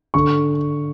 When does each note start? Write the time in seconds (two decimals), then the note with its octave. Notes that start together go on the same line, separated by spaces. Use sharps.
0.14 D3 C#6